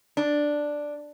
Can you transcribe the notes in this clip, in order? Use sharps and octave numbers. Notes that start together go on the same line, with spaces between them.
D4